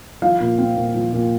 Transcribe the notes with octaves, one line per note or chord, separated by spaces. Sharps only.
F3 F5
A#2
C4
A#2
F3
A#2